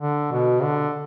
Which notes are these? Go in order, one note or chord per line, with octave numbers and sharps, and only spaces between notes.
D3
B2
D3